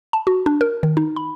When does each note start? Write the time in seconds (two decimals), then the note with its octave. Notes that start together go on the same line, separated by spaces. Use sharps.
0.13 A5
0.27 F#4
0.46 D4
0.61 A#4
0.83 D#3
0.97 D#4
1.16 B5